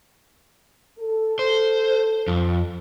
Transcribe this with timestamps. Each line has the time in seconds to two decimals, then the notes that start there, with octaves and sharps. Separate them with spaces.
0.99 A4
1.39 C5
2.28 F2